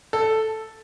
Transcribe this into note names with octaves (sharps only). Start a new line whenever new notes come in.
A4